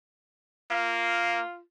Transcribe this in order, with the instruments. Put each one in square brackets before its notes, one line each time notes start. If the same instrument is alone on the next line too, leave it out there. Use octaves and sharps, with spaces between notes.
[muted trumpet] A#3 [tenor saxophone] F4